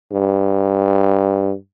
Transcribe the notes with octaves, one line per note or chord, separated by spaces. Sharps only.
G2